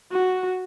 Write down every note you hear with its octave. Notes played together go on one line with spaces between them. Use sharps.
F#4